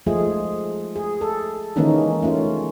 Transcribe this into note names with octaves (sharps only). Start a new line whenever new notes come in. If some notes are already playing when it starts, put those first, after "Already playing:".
F3 G#3 A3 F4 G#4
G#4
A4
D#3 E3 G#3 A#3 C#4 D#4
A3 C#4 F4